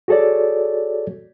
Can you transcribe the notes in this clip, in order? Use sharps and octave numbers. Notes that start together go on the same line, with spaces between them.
F#4 G#4 A4 C#5 D5